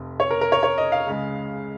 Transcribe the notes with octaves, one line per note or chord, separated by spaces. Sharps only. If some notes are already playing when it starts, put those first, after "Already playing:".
Already playing: F1 F2
C#5
A#4
A#4
C#5
C#5
D#5
F5
C#2 C#3 G#3